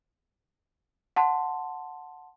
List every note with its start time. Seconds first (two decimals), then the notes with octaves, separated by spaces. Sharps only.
1.16 F#5 A5 C6